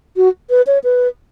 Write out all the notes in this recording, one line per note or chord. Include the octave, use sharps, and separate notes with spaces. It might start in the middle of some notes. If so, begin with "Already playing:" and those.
F#4
B4
C#5
B4